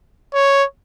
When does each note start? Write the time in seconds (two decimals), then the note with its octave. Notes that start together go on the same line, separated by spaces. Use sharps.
0.34 C#5